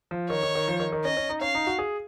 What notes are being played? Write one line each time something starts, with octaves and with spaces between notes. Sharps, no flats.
F3
D#3 C#5
D#3
D#3
F3
D#3
D#3
C#4 D#5
C#4
D#4
C#4 F5
D#4
F#4
G#4